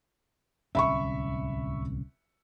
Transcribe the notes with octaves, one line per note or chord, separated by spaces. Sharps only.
D1 C2 C#4 E5 B5 C#6